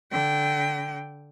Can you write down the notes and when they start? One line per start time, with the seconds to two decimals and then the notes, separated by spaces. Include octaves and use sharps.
0.12 D3 G5